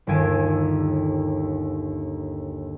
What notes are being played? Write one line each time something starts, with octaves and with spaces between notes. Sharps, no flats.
G1 D#2 A4 G#5 D7